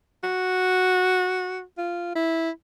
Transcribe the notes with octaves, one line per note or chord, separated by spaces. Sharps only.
F#4
F4
E4